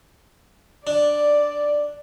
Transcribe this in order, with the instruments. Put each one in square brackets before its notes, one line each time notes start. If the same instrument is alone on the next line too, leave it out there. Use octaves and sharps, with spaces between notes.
[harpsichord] D4 [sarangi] D5